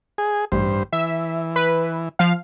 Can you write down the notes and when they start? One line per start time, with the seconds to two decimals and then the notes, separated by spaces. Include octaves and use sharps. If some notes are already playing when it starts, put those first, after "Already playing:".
0.18 G#4
0.52 A1 G2 C5
0.93 E3 E5
1.56 B4
2.19 F3 F5